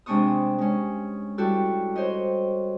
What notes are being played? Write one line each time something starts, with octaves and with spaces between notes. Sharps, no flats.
C3 G#3 C4 D4 C#6 D#6
G#3 C#4
G3 E4 F#4 G4 A4
C5 C#5 D#5